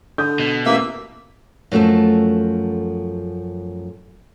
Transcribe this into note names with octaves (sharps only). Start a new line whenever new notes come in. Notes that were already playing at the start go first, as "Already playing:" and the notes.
D3 D#6 G6
B2
A1 A#3 E5 E6
F#2 F3 A3 F#4 A4